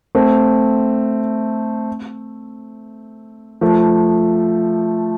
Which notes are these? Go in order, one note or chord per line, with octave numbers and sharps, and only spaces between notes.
A3 C4
F3 A3